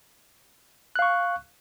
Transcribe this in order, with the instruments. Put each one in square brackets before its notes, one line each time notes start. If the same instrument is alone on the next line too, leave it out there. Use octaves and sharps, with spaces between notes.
[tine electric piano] F#6
F5
C#6